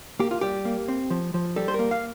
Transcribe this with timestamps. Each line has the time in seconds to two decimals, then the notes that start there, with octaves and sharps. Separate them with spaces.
0.19 A#3 G4
0.31 F4
0.41 G3 G4
0.65 A#3
0.88 C4
1.10 F3
1.34 F3
1.56 G3 A4
1.68 C5
1.74 A#4
1.79 A#3
1.91 F5